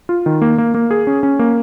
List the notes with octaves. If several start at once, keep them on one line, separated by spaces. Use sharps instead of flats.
F4
D#3
A#3
A#3
A#3
G#4
C#4
C#4
A#3